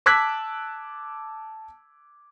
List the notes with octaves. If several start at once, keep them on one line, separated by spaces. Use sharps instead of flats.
A5 D6 E6 F#6 G#6 B6